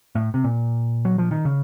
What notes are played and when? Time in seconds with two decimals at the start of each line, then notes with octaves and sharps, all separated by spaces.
0.15 A2
0.34 C3
0.44 A#2
1.05 F#3
1.18 F3
1.31 D#3
1.45 C#3